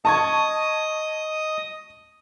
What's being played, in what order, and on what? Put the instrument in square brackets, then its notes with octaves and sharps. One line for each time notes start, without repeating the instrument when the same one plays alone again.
[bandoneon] D#5 D#6 [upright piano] A5 C#6 G#6